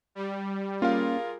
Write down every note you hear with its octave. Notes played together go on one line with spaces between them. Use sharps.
G3
A#3 C#4 F4 G#4 A#4 F5